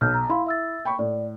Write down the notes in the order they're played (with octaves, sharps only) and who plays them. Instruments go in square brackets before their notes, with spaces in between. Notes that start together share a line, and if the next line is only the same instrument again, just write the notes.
[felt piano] B1 [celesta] F6 G6
[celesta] A#5
[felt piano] E4 [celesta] F5 B5 C6
[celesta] E5 E6 A6
[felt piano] G5 B5 C#6
[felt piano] A2 [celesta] D5